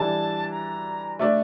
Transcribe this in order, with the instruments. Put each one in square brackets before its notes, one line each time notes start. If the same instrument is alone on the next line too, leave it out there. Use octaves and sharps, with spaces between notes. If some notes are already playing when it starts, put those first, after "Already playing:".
Already playing: [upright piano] E3 G3 D4 A4 [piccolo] A5
[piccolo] A#5
[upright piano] A3 D4 A4 D5